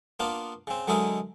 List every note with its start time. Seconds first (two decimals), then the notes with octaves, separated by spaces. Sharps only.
0.20 A#3 B3 D4 F4
0.67 C#3 C4
0.88 D3 F#3 G#3 D#4 E4 A#4